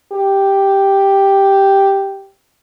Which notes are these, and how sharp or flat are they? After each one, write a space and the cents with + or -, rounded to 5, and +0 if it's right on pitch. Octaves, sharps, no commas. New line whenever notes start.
G4 +0